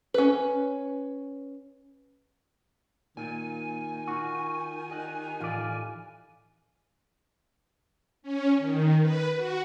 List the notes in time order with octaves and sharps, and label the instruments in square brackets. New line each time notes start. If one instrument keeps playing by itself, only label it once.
[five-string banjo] C#4 B4
[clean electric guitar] A#2 [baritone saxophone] D#3 [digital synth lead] G#5
[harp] D#4 F4 [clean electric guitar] F#4
[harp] G4 D#5 F#6
[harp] A2 E3 [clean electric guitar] F4 D5
[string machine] C#4
D#3
B4
F#4